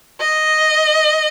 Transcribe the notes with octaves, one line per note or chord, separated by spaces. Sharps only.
D#5